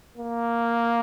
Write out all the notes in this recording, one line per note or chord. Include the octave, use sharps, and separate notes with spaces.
A#3